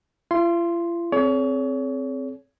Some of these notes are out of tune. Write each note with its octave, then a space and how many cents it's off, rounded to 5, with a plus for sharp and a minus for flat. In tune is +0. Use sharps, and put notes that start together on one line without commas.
F4 -45 C6 +0
C4 +0 G#4 +45 C#5 +35